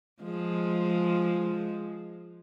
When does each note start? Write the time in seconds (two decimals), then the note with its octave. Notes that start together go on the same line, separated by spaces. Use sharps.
0.22 F3 G#3